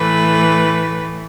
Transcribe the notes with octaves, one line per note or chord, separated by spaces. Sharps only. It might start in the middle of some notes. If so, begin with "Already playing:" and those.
Already playing: A2 E3 A3 B4